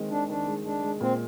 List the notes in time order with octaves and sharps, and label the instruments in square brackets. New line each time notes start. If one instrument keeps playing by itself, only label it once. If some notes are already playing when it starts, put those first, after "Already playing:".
Already playing: [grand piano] D#3 G#3 C4
[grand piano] D#3 [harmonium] D4
[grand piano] D#3 [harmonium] D4
[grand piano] G#3
[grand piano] G#3 [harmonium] D4
[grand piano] G#3
[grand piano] A#2 [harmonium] C4